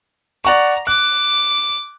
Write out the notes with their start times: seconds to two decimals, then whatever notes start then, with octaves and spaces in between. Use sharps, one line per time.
0.45 D5 F#5 A#5 C#6
0.87 D6 F#6